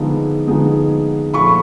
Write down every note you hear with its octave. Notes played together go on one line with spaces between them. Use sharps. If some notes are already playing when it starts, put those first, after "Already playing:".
Already playing: D3 F3 G#3 B3 D#4
D3 F3 G#3 B3 D#4
A#2 F3 A3 B5 C#6